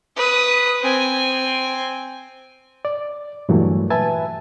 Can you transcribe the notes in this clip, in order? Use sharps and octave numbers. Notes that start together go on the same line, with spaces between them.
B4 D#6
C4 G#5
D5
G2 A#2 E3 F#3 A3
B4 E5 G#5 A5 A6